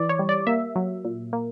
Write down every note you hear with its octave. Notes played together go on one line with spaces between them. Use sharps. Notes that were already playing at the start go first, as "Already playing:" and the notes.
Already playing: E3 D5
C#5
G3
D5
A#3 E5
F#3
A#2
A#3